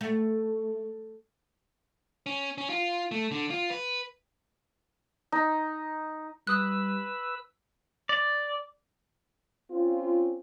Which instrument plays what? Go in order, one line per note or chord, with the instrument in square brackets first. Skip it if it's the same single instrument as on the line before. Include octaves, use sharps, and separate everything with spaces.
[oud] A3
[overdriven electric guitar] C#4
C#4
F4
A3
D3
F4
B4
[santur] D#4
[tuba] G3 [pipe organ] B4 E6 [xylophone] D#6 F#6
[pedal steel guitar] D5
[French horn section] C4 C#4 F4